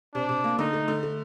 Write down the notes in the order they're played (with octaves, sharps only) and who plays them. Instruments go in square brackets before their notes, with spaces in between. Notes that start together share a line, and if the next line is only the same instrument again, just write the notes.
[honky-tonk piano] C3 [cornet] D4
[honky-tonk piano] C3
A#3
[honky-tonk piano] D3 [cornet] D#4
[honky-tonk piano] A3
D3
A3